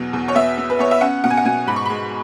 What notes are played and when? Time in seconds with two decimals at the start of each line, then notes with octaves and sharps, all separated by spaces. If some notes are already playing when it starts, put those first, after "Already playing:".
Already playing: E2 B2 F#3
0.13 E2
0.28 C#5
0.35 B3 E5
0.58 B3
0.70 B4
0.79 B3 C#5
0.91 E5
1.01 C#4 F#5
1.24 B2 F#5
1.30 G#5
1.37 F#5
1.45 B2 G#5
1.67 G#2 B5
1.76 C#6
1.85 G#3 B5